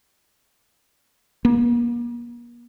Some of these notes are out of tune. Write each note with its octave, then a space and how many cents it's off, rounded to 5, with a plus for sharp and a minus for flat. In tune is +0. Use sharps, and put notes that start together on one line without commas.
A#3 +40